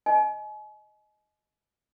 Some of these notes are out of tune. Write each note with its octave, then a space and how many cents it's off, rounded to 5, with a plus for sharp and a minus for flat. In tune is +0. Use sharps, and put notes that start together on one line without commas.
D#5 +0 G#5 +40